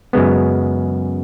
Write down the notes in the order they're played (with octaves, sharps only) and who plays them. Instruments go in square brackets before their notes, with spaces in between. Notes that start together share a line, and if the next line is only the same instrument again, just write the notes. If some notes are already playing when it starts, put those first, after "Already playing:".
[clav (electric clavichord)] F#2 C#3 G#3 B3